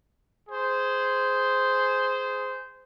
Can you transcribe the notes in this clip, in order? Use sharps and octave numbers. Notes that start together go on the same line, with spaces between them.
G#4 C5